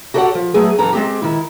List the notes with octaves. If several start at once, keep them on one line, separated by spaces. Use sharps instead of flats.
F#4 G4 A4 C#5 D5 F#5
F3
F#3 A3 B3 G#4
F#2 E3 A4 A#5
G#3 C4 G4
D#3 E4